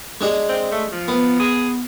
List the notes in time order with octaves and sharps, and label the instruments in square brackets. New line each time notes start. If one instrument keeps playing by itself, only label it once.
[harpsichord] G#3 D4 G#4
[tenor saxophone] C4
A3
F3
[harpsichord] B3
[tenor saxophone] G#4